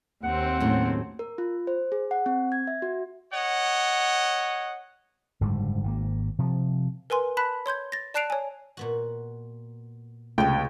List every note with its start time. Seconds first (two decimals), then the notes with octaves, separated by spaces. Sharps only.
0.23 D#2 C4 F#5
0.60 F#2 A2
1.19 A#4
1.38 F4
1.67 C5
1.92 G#4
2.11 F#5
2.26 C4
2.52 G#6
2.67 E5
2.82 F#4
3.31 C#5 D#5 F#5
5.41 F#1 G#2 D3 G3
5.84 G#1 B2 A#3
6.39 C3 F3
7.10 A#4 B4 G#5 C6
7.37 A5 B5 F#6 B6
7.66 C#5 C6 G6 G#6
7.92 A6 A#6
8.14 D5 A5 F#6 C7 D7 F7
8.30 C#5 G#5
8.77 A#2 B3 F#4
10.38 C#2 C3 A3 C#5 D#5 G5